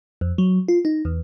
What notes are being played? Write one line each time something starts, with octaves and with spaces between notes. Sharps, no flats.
F2
F#3
F4
D#4
E2